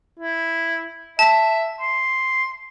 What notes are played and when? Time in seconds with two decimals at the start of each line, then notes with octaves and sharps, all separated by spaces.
0.20 E4
1.19 E5 A5
1.80 C6